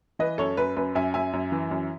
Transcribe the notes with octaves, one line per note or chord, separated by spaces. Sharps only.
E3 B4 D#5
F#2 A4 C#5
F#2 B4
F#2 B4
F#2 E5 G#5
F#2 E5 G#5
F#2
E3
F#2